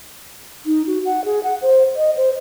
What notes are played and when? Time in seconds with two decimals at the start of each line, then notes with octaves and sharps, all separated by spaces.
0.66 D#4
0.87 F#4
1.06 F#5
1.25 G#4
1.43 F#5
1.62 C5
1.96 D#5
2.16 C5